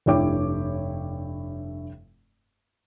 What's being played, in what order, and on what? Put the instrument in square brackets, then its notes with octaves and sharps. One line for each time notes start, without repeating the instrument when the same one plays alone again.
[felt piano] F1 G2 E4 C#5 G5 D6